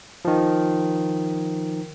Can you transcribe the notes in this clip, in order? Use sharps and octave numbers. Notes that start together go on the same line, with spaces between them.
D#3 F3